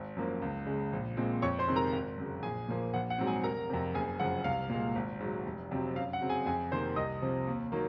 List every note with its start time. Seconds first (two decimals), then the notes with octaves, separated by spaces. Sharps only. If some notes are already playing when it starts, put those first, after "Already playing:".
Already playing: G#1
0.16 F#2 F3 A#3
0.42 C#2
0.67 C#3 G#3
0.93 A#1
1.17 A#2 F3 G#3 C4
1.42 F2 C#5 C#6
1.59 C5 C6
1.68 C3 D#3 G#3 C4
1.76 A#4 A#5
1.92 G#1
2.18 F#2 C#3
2.43 A#1 G#4 G#5
2.68 A#2 F3 A#3
2.94 A#1 F#5
3.10 F#5
3.18 G#2 F#3 C4
3.27 G#4 G#5
3.44 F1 A#4 A#5
3.70 F2 C3
3.95 F#1 G#4 G#5
4.20 F#2 C#3 F3 F#5
4.44 C2 F5
4.69 A#2 G#3
4.95 G#1
5.20 G#2 F#3
5.46 F1
5.71 F2 C3 F#3 C4
5.96 F#2 F5
6.13 F#5
6.21 C#3 F#3 C4
6.29 G#4 G#5
6.46 F2 G#4 G#5
6.72 C3 D#3 A#3 C5 C6
6.96 C2 D#5 D#6
7.22 C3 F3
7.47 D#2
7.72 D#3 F#3 A#3